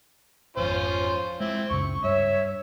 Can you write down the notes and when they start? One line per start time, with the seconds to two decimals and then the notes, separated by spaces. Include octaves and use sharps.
0.57 G#1 F2 C#4 F4 C5
1.40 G#3 C4 E4
1.70 C#2 F#2 C#3 C#6
2.04 G2 C#5 E5